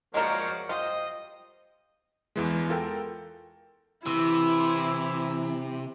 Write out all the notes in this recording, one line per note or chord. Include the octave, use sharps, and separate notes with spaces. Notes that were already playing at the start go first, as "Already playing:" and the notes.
F3 G#3 A#3 C#4 F#4 A#4 C#5 D5
F4 G4 C5 D#5
E2 E3 G#3
F4 A4 A#4 G5
C3 E3 E4 E6